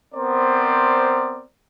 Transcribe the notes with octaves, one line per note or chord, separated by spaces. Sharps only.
B3 C4 A#4 C5 D5